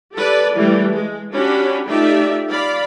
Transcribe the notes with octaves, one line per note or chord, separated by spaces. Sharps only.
G4 A4 B4 D5
E3 G3 A3
G#3
C#4 D4 F#4 G4 B5
A3 D#4 F4 G4 D5 E5
D5 F5 B5